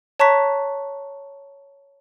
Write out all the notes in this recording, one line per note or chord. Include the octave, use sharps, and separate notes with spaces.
C#5 A5 A#5 C#6 F#6 B6